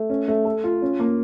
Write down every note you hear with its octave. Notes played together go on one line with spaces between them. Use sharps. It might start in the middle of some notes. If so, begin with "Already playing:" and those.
Already playing: A3
C#4
A3
A4
F4
C#4
A#3